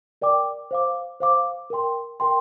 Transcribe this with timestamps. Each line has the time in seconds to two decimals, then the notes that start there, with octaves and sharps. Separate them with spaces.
0.22 A#4 D5 G5 D6
0.71 C5 F5 D6
1.20 C5 F5 D6
1.70 A#4 G5 C6
2.20 A#4 G5 C6